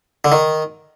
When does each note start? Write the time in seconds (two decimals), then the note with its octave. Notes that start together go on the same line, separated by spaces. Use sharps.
0.25 D3
0.32 D#3